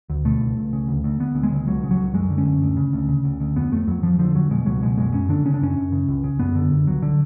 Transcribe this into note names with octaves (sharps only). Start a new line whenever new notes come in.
D2
B2 A3
C#2
C#2
C#3
D2
D2
D2 B3
D2
G#3
C#3
C#2 F#3
C#3
F#3
C#2
F#2 G#3
D3
C#4
F#2
D2
C#3
D2
C#3
D2
D2
F2 B3
F2 A3
F2 F#3
F2 F3
D3 F3
F2 F#3
B2 G#3
C#2 F#3
B2 G#3
F#2 G#3
F#2 C#4
D3 D4
C#3 C#4
D4
F#2 C#4
F#2
C#3
C#2
C#3
F#2 B3
D3
F#2
C#2 F#3
D3